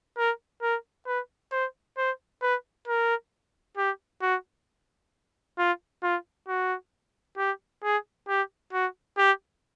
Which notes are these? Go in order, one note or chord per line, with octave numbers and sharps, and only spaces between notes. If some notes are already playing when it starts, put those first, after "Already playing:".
A#4
A#4
B4
C5
C5
B4
A#4
G4
F#4
F4
F4
F#4
G4
G#4
G4
F#4
G4